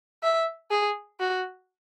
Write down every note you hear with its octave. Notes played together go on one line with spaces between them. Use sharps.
E5
G#4
F#4